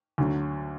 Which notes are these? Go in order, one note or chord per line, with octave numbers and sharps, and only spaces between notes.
D2 D3 F#3